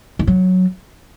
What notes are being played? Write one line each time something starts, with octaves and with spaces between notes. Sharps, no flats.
D#3
F#3